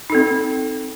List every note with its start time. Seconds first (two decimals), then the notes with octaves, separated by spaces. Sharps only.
0.10 D#4
0.12 A4
0.15 C4